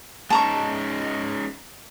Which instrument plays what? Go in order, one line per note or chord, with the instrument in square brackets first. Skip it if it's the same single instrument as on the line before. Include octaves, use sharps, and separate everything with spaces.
[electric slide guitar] G#3 C#4 D#4 [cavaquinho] A5 A#5 C#6